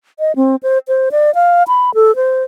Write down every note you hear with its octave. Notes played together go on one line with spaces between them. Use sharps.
D#5
C4
C5
C5
D5
F5
B5
A4
C5